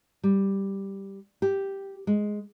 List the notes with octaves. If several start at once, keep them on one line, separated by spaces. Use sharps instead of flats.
G3
G4
G#3